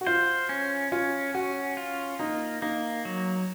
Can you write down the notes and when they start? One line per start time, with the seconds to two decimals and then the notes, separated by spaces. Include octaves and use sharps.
0.01 F#4
0.07 F4 C5
0.49 C#4
0.92 C#4 F4
1.34 C#4 F#4
1.77 F4
2.19 A#3 D#4
2.62 A#3 D#4
3.05 F#3